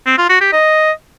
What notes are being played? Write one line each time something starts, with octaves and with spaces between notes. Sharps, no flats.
C4
F4
F#4
G4
D#5